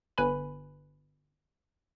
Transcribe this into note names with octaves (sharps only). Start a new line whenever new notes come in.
G1 B4 G#5 B5